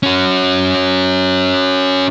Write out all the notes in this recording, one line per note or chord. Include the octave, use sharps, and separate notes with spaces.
C#4 F#4